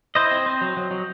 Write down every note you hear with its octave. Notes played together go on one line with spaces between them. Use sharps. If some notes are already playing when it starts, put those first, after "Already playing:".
E4 C5 D#5
C4
C4
F#3
F#3
F#3